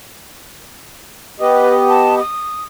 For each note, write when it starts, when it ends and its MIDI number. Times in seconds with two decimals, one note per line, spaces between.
1.40 2.20 59
1.40 2.20 67
1.40 1.74 71
1.40 2.20 75
1.89 2.17 81
2.19 2.63 87